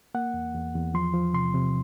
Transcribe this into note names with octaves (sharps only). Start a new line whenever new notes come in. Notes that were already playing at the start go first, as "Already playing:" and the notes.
A#3 F#5
E2
E2
E2
F3 C6
F3
C3 C6
C3